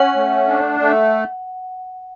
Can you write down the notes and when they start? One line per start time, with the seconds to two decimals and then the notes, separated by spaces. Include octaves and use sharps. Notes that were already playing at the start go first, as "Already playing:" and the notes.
Already playing: C#4 F#5
0.16 A3
0.48 D4
0.80 A3